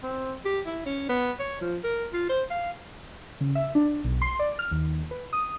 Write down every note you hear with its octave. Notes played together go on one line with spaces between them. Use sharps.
C4
G4
E4
C#4
B3
C#5
F3
A#4
F4
C5
F5
C#3
E5
D4
B1
C6
D5
F6
D#2
B4
D#6